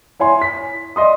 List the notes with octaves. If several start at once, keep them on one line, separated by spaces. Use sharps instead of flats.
E4 C#5 G#5 C6
B6
D5 D#5 C6 D#6